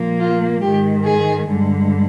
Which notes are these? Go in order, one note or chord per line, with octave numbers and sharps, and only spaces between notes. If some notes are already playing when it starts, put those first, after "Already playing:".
Already playing: A#2 F3 A#3
F4
G#2 D#3 G#3 G4
G#4
G2 D3 G#3